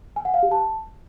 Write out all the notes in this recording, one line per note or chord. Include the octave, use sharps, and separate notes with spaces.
G#5
F#5
F5
G4
A5